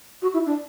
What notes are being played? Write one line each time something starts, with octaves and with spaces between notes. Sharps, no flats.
F#4
E4
D4